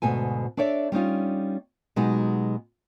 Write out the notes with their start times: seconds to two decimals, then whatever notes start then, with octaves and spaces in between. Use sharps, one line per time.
0.02 D2 G#2 B2 A4 G#5
0.57 D4 A4 C#5 D5 E5
0.92 G3 C#4 D#4 F4
1.96 B2 F#3 G#3 D#4 G4